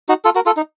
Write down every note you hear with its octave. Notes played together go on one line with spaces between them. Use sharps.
D#4 F#4
F4 A4
F#4 A#4
F4 A4
D#4